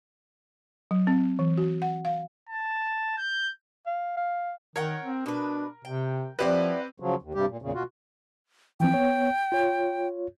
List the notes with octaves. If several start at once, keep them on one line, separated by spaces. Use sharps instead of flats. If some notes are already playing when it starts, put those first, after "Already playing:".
F#3
C4
E3
F#4
F#5
F5
A5
G6
F5
F5
D#3 A#4 C#5 F#5 G5
C4
B2 D4 B4
C3 G5
F3 C4 E4 G4 B4 D5 F#5
C#3 F3 F#3
D#2
G2 C3 G3 G4
A#2
E2 A#2 C#3
B2 F4 F#4
E3 F3 C4 G5
B3 C#5
F4 C#5